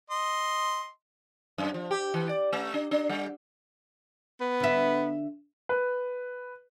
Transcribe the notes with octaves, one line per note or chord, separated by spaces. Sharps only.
D#5 C6
F#2
F3
G4
E3
D5
A3
D4
D4
G3
B3
D3 E5
B4